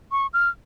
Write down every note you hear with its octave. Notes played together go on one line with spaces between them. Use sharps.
C#6
F6